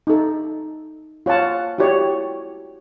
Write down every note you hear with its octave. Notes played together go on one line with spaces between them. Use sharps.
D#4 A4
F4 C#5 F#5 A5
E4 F#4 G4 C#5 D5